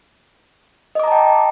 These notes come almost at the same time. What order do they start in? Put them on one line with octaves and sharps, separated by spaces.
D#5 D6 A#5 A5 G5